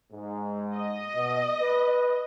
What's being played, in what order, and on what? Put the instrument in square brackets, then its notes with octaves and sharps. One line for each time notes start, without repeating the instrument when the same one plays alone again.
[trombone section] G#2
[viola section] D#5
[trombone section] B2
B4